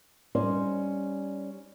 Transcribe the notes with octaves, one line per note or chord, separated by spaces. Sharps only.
G3 C#4 D#4 C5 D5